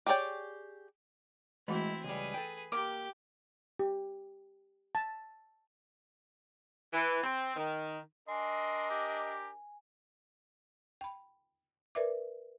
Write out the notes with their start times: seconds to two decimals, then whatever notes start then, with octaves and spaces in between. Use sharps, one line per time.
0.06 G4 G#4 C#5 D5 G5
1.68 E3 G#3 A3 C4 E4 F#4 B5
2.04 C#2 G3 G#4 B4
2.34 A4 G5
2.72 A#3 G4 A#4 D6
3.79 G4
4.95 A5
6.93 E3
7.24 C4
7.56 D#3
8.28 D4 A#4 D#5 G#5 C6
8.90 G4
11.01 G5 B5
11.95 A#4 B4 D5 E5 D6